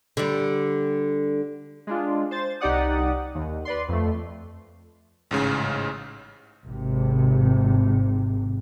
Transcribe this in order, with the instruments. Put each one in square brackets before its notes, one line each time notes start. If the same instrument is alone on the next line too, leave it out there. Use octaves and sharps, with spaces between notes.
[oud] D3 G3
[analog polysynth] G#3 D4 F4
C5 A6
C2 D#4 G4 D5 F#5 D#6
D#2
B4 D5 C6
F2 A3
[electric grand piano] A1 G#2 C#3
[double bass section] G#1 C3